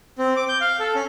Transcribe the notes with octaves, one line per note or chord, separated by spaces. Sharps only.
C4
D6
G6
F5
A4
C#4